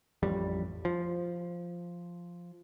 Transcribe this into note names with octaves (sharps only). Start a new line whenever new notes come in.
A1 F2 G3
F3